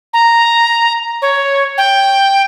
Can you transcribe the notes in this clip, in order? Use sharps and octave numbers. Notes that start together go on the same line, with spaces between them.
A#5
C#5
G5